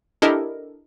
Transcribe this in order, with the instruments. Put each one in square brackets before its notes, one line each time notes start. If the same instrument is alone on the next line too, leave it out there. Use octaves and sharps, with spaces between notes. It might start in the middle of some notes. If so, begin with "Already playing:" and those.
[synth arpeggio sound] D4 E4 G4 A4 A#4 D#5